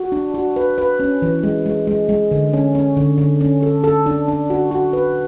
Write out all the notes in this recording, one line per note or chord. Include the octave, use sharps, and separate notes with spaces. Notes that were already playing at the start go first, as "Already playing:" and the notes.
Already playing: F#4
D4
F#4
B4
B4
C#4
E3
G#3
G#3
G#3
G#3
D3
C#4
C#4
D3
D3
C#4
A4
A4
D4
D4
F#4
F#4
B4